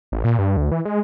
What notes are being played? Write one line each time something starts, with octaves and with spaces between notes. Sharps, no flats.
A1
A#2
G2
D2
E3
G#3